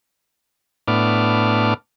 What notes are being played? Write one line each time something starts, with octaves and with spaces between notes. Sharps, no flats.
A2 B3 D4 D6 F6